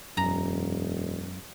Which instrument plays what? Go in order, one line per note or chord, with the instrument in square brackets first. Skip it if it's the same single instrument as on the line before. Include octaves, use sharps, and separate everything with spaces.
[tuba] E1 [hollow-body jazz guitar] F#2 [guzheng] A#5